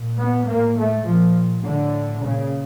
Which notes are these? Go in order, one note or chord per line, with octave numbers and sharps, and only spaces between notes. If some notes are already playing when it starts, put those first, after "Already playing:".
Already playing: A#2
B3
A2 A#3
A3
A#2 F3
A2 D3
A#2 C#3